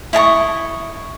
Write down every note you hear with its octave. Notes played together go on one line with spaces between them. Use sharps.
E4 D#5 A5 C#6